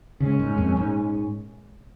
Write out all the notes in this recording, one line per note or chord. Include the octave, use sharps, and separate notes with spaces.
A#2 C#3 G#3 C#4
G#2
F2
G#2